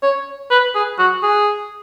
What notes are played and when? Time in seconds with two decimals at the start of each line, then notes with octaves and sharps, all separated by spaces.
0.03 C#5
0.51 B4
0.75 G#4
0.99 F#4
1.23 G#4